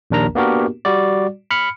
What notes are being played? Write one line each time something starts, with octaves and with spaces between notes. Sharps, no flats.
A#1 D#2 D4 A#4 A#5
A#3 B3 D4 F#4 G4 A#4
G3 F#4 D5
B5 F6 C#7